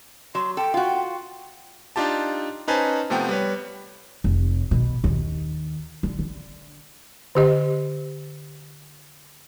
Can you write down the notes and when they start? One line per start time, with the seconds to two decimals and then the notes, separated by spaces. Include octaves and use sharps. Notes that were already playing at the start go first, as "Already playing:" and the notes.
0.35 F#3 C6
0.57 A4 G5
0.74 F4 F#4
1.96 D4 D#4 F4 G4 A5
2.68 C#4 D#4 B4 C5 G#5 A5
3.10 C3 F3 A3 B3 G5
3.29 G3 B4 C#5
4.24 F1
4.71 B2
5.04 D#2
6.03 D3
6.19 D3
7.35 D3 G4 D#5